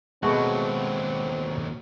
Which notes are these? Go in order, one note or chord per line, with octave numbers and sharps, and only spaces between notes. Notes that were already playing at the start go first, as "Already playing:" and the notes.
D#2 B2 F#3 G#3 A3 C4 F#4